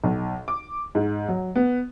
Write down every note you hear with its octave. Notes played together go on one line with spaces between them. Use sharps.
B1
D6
G#2
F#3
B3